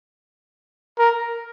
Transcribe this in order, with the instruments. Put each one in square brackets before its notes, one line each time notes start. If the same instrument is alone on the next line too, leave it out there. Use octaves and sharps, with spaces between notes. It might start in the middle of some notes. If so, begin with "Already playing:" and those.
[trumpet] A#4